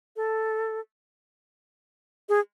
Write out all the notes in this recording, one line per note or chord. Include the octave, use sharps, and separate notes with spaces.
A4
G#4